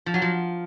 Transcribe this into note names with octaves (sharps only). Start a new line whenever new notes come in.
F3
F#3
F3